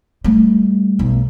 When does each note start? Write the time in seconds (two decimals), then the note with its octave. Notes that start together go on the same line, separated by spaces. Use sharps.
0.24 G3 A3
0.99 B1